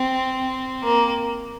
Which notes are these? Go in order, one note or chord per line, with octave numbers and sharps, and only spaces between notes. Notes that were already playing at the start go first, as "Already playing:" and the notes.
Already playing: C4
A#3